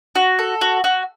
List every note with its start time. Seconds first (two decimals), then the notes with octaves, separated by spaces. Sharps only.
0.15 F#4
0.39 A4
0.61 F#4
0.84 F#4